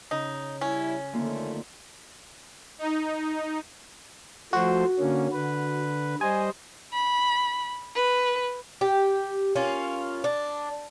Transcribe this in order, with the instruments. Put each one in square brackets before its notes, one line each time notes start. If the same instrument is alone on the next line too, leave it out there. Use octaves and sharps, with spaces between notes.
[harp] C#3 [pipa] D#4
[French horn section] G3 E4 [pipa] C#4
[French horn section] F2 D#3 A3 [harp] D3 A#3 F4
[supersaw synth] D#4
[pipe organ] F3 A3 C5 [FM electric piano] F#4
[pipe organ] D3 A#3 C#4
D3 B4
[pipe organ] G3 C5 D#5 [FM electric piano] G#5
[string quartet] B5
B4
[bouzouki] G4
A#3 C#4 F4
D4